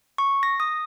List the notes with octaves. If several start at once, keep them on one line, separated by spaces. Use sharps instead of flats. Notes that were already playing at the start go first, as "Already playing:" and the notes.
C#6
A#6
D#6